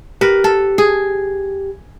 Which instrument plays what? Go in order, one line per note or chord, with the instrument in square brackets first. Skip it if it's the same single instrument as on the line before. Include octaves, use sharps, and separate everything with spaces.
[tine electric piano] G4 [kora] A#4 B4
[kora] A4
G#4